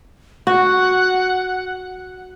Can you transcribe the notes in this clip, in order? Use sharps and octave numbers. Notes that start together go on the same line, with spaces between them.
F#4 F#5